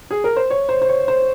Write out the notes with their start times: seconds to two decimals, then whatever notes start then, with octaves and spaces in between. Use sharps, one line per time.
0.11 G#4
0.24 A#4
0.36 C5
0.50 C#5
0.69 C5
0.82 C5
0.89 C#5
1.08 C5